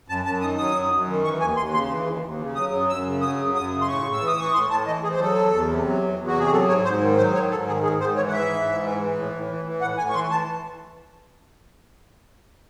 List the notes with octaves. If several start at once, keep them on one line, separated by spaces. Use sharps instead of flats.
F#2 A5
F#2 A5
D#3 D#6
F#3 D#6
F#2
F#2
D#3
E3 C#6
D#2 G#5
D#2 C6
C#3 C6
E3
D#2
D#2
C#3
F#3 D#6
F#2
F#2 E6
C#3
F#3 D#6
F#2
F#2 D#6
C#3
C6
A2 C#6
A2
E6
E3
D#6
E3 C#6
A2 C6
A2 A5
E3 D#5
E3 G#4
C5
F#3 A4
E2
E2
C3
F#3
E2
E2
F#4
C3 G#4
F#3 A4
G#2 C#5
G#2 C5
D#3
F#3 C5
G#2 C#5
G#2 A4
D#3 G#4
G#2 G#4
G#2 C5
E3 C#5
F#5
E3 E5
G#2
G#2
E3
E3
A2
A2
E3
E3
A2 F#5
A2 G#5
C#6
E3 C6
E3 A5